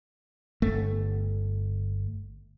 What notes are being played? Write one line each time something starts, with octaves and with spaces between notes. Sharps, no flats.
G1 A3